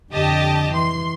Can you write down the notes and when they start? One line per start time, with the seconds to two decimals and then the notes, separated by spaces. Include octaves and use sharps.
0.12 F2 D3 G4 D#5 A5
0.73 E3 C6